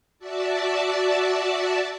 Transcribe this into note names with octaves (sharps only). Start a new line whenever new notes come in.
F#4 D5 E5 A5